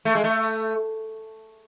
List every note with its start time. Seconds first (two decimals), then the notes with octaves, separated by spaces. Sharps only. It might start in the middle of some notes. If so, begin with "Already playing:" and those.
0.05 A3
0.15 G#3
0.24 A3